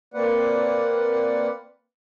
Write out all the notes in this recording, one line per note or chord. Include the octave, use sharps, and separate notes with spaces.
A#3 C4 B4 D5 F#5